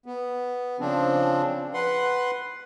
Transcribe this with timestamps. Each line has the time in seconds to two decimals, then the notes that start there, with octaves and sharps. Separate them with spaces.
0.06 B3
0.80 C#3 F3 C4 D4
1.74 B4 F#5 C6